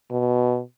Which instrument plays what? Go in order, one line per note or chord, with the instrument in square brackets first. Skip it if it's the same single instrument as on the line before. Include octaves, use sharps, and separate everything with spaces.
[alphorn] B2